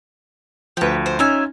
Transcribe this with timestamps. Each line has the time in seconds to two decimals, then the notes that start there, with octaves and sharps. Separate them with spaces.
0.77 D2 F3 G4 B4
1.06 C5
1.19 C#4 D#4 F4 E5 G#5